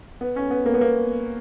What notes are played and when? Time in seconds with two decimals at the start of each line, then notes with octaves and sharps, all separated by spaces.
0.21 B3
0.36 C#4
0.50 B3
0.66 A#3
0.74 B3
0.81 A#3